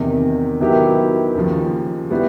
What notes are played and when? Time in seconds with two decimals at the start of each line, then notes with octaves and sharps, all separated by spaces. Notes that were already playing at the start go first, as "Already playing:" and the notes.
Already playing: E2 C3 D#3
0.60 D#3 F#3 B3 E4 G4
1.35 D#2 C#3 F3
2.10 G3 B3 E4